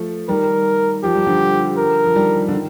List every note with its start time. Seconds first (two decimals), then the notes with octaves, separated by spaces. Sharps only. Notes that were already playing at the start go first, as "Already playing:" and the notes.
Already playing: F3 A3
0.29 D#3 G3 A#4
1.04 F3 G4
1.15 G3
1.26 D3 F3
1.78 A#4
2.04 F3
2.15 D#3 G3
2.48 D3
2.52 D#3